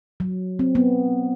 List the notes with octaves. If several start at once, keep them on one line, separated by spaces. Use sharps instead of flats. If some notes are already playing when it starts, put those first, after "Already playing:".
F#3
C4
B3